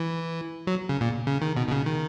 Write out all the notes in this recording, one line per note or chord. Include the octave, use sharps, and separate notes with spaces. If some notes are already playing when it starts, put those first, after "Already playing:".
Already playing: E3
F#3
C#3
A#2
C#3
D#3
B2
B2
C#3
D#3